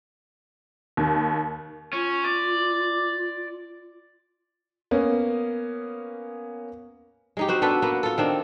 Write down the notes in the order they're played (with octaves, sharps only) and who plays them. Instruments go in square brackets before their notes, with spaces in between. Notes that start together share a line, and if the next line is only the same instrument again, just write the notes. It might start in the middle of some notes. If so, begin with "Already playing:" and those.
[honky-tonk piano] D#2
[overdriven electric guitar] C#4 [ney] F4
[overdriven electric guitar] D5
[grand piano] A#3 B3 C#4
[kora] G#3 D#4 G4
C4 F#4 C5
B3 D4 A4 B4
A#3 B3
F4 A4
D#3 C4 D4